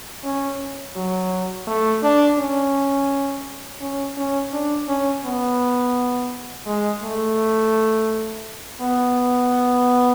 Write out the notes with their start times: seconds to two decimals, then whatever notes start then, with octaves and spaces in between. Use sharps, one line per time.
0.24 C#4
0.96 F#3
1.67 A3
2.03 D4
2.39 C#4
3.81 C#4
4.17 C#4
4.53 D4
4.88 C#4
5.25 B3
6.66 G#3
7.03 A3
8.81 B3